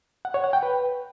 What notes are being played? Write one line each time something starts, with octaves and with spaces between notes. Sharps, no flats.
F#5
C#5
F#5
G5
B4